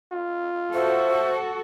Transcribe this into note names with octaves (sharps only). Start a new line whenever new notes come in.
F4
F#4 A4 C5 E5